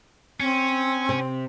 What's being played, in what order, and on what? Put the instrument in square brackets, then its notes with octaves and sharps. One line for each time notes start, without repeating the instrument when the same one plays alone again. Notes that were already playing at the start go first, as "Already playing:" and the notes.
[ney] C4 [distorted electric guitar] C#4
[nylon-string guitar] C3